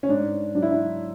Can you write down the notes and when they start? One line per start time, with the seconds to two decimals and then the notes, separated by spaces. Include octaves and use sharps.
0.03 C#4
0.09 G#2 D4
0.55 F#3 D4
0.62 E4
0.70 D4